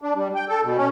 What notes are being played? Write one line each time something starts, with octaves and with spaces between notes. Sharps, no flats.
D4
G3
G5
A4
B2
C#4